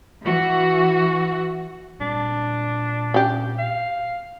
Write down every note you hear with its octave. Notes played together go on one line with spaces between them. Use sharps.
E3 F#4
A#2 G3 C4 D4
C#4 G4
F5